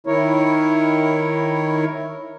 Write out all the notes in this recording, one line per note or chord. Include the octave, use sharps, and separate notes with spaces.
D#3 E4 A#4 C#5